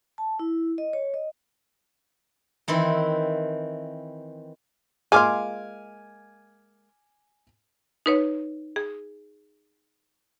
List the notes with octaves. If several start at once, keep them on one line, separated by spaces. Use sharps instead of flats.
A5
E4
D#5
C#5
D#5
D#3 E3 C4 E4
G#3 A#3 F4 G#5 D6 F6
D#4 B4 C#5
G#4